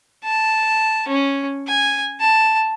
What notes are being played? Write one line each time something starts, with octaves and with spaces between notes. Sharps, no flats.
A5
C#4
G#5
A5